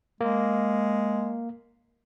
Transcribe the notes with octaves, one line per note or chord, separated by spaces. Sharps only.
G#3 A#3